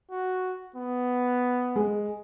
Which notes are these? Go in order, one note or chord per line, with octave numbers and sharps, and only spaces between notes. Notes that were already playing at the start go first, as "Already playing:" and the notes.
F#4
B3
G#3